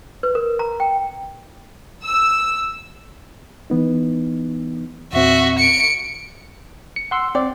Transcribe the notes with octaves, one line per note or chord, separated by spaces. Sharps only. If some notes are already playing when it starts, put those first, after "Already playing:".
B4
A#4
A#5
G5
E6
E3 B3 D#4
E2 A#2 C4 F#4 E5
C#7 D7
C#7
F#5 C6 E6
C4 D5